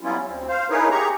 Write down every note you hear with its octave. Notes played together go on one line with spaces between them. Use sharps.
F#3 G3 B3 C#4 E4 F4
D2 C4
C5 F5
D#4 E4 G#4 A#4 B4 C#5
G4 G#4 A#5 C#6